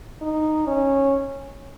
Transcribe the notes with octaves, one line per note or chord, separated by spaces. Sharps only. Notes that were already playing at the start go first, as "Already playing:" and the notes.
D#4
C#4